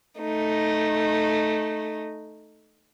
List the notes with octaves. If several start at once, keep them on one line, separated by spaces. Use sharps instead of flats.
A3 D#4